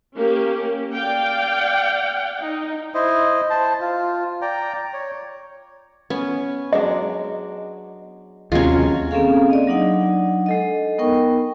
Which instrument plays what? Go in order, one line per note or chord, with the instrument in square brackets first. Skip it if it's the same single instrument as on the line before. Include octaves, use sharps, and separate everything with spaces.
[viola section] A#3 C#4 G4
D5 F5 G5
D#4
[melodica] E4 C5 D#5
C5 A5
F4
D5 G5 A#5
C#5
[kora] B3 [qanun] C#4
[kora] F#3 G#3 D4 [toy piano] D#5
[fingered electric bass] D#2 C3 [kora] F#3 G#3 [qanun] C#4 F4
[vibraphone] A#3 C4 C#4 G#4 A4 F5
D5 D#5
F#3 D4 D#4 F#5
G#3 A4 D#5
B3 D#4 A#4 G5 C#6